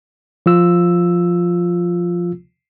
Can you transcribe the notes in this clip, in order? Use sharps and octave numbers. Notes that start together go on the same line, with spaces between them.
F3 F4 E6